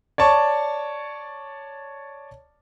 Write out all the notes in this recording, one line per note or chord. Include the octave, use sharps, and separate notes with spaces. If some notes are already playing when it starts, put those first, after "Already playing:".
C#5 D5 A5 C#6